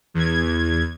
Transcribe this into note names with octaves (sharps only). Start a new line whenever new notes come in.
E2 G#6